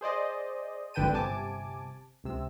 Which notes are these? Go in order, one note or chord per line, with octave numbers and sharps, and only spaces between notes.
G#4 C5 D5 D#5
G#1 D3 B4 G5 A5 D#7
G1 C3 G#5 A5 D6
C#2 C3 E6